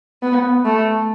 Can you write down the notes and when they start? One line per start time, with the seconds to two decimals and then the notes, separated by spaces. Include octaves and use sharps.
0.23 B3
0.65 A3